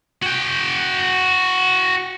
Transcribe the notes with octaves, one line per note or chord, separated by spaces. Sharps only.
F#4 G5